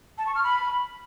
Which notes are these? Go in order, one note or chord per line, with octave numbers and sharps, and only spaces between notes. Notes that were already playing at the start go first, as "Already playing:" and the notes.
A5
C#6
F6
B5